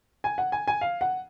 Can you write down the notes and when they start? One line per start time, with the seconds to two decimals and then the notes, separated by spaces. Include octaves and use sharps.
0.24 G#5
0.38 F#5
0.52 G#5
0.68 G#5
0.81 F5
1.01 F#5